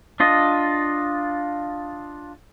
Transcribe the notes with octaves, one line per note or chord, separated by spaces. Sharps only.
D4 F4 D#5